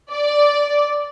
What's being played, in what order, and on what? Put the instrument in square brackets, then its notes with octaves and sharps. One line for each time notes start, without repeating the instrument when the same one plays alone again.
[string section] D5